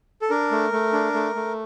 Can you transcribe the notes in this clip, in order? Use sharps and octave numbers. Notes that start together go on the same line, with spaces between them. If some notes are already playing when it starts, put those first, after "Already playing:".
A4
D4 A#4
A3
A3
D4
A3
A3